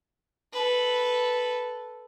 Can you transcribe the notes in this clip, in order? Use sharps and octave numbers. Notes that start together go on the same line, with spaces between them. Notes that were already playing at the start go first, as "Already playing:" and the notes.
A4 B4